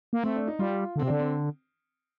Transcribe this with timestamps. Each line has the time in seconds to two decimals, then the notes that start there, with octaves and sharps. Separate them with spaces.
0.13 A#3
0.24 A3 C4
0.36 D4
0.47 D#4
0.59 G3 F4
0.96 D3
0.99 C4
1.03 C3
1.07 D3 D4
1.19 C4